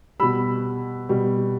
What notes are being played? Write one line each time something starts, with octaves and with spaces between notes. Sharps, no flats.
B2 G3 B5 E6
B2 G3